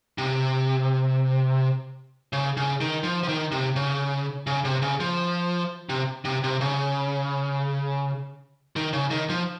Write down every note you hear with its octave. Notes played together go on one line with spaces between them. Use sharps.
C3
C#3
C#3
D#3
F3
F3
D#3
C3
C#3
C#3
C3
C#3
F3
C3
C3
C3
C#3
D#3
C#3
D#3
F3